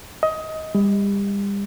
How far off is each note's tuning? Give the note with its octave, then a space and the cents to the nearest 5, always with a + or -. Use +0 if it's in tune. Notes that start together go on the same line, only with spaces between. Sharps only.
D#5 +20
G3 +35